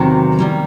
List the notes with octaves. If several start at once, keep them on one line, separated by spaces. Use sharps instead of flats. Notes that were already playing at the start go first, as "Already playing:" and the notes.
Already playing: E2 C3 D#3 F#3 A#3
D#3 G3 A#3